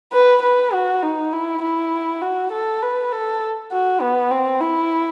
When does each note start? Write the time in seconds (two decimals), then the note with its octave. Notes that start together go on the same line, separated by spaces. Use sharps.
0.13 B4
0.42 B4
0.73 F#4
1.03 D#4
1.33 E4
1.62 E4
2.22 F#4
2.52 A4
2.82 B4
3.12 A4
3.72 F#4
4.02 B3
4.31 C4
4.60 E4